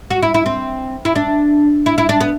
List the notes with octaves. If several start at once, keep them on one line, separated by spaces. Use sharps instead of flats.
F#4
E4
E4
C4
E4
D4
E4
E4
D4
B3